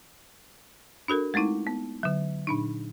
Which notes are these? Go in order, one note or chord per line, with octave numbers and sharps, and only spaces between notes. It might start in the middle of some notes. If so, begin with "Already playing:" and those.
D4 F#4 A4 A#4
G#3 A3 C4 D#4 E4
B3
D3 F#3
A#2 D4 D#4